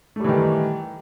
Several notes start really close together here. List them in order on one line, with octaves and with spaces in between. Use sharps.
A3 G3 E3 D#3